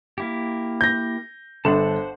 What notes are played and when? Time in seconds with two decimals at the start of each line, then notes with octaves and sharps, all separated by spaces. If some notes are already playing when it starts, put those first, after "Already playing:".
0.18 A#3 E4 G4
0.81 G6 A#6
1.65 G1 A4 C5 F#5 A5